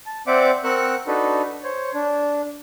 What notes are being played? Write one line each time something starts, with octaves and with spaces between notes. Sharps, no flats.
A5
C4 C5 D5 E5 F#5 D6
C4 A#4 F#5 C#6 E6 F#6
D4 D#4 F#4 A4 B4
C5 C#5
D4